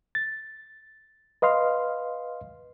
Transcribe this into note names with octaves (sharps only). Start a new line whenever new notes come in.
A6
B4 D#5 F5 C6 F6